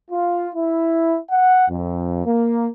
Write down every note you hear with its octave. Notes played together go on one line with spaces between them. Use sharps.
F4
E4
F#5
F2
A#3